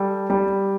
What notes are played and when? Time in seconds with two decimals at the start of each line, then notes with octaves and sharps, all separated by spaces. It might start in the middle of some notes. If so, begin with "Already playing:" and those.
Already playing: G3 A4
0.30 G3